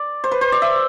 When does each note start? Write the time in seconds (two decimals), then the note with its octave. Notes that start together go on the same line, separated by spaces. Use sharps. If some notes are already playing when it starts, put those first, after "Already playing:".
Already playing: D5
0.24 C5
0.31 B4
0.41 C5
0.52 D5
0.62 E5